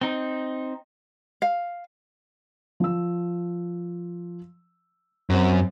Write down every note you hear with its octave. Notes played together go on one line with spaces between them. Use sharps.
C4 D#4
F5
F3 E6
F#2 C4 C5